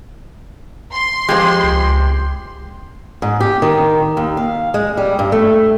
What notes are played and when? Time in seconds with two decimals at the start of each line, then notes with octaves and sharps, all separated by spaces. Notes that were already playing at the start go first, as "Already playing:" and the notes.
0.93 C6
1.29 F2 G#3 G4 C5
1.64 C#2
3.22 G#2
3.40 G4
3.62 D#3
4.17 D#2
4.37 F5
4.74 G#3
4.97 G3
5.19 G2
5.32 A3